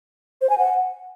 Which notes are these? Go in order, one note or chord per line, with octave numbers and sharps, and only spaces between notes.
C5
G#5
F#5